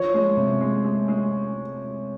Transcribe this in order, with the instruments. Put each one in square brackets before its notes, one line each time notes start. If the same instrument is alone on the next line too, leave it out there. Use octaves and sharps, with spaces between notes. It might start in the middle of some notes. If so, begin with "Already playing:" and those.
Already playing: [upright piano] F3 [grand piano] C#5
[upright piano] G#3
C3
G#3
G#3
G#3